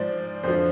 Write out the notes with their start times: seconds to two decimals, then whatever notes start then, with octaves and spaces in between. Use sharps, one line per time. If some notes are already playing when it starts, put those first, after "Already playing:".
Already playing: G#2 F3 C5 D5
0.43 F2 D3 F3 C5